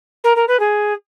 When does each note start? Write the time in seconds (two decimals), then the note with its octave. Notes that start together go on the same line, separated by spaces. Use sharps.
0.24 A#4
0.36 A#4
0.48 B4
0.60 G#4